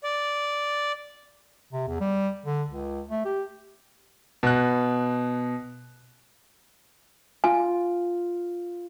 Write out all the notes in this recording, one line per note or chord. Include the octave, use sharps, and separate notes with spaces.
D5
C3
E2
G3
D3
C#2
A3
G4
B2 F#6
F4 G#5